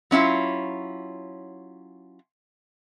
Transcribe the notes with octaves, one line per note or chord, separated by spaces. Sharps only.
F#3 C#4 E4 F4